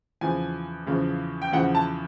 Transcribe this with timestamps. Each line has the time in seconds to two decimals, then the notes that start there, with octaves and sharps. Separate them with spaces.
0.21 E2 C#3 F3 G#5
0.87 E2 C#3 F3
1.42 G5
1.52 E2 C#3 F3 F#5
1.75 A5